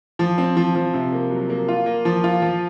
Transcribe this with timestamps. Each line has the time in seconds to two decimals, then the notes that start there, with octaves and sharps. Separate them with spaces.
0.19 F3
0.38 C4
0.57 F3
0.75 F3
0.94 C3
1.12 A#3
1.31 F#3
1.50 A#3
1.68 F4
1.86 A#3
2.05 F3
2.24 F4
2.42 F3